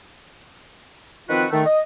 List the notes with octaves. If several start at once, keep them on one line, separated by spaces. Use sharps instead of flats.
D#3 F3 C4 F4 F#4 B4
D#3 A3
D#5